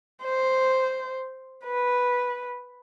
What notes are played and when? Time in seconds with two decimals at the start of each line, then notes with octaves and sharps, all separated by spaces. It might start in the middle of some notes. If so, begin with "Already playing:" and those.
0.22 C5
1.65 B4